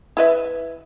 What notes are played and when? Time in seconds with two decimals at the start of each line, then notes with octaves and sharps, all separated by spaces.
0.17 E4 B4 E5